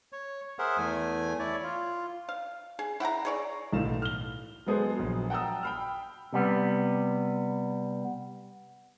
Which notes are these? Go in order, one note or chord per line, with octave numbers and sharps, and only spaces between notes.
C#5
G#4 A#4 C5 E5 F#5
E2 A3 G#5
E4 C#5 D5
F4
F5
G#4
E4 F#5 G5 A#5
G#4 C#5 D5
B1 A2 F5 E7
F6 G7
F#3 G#3 B3 G#4 A4 C5
A#1 F#3
F#5 G5 A5 A#5 D#6 E6
G5 B5 F6
C3 G3 B3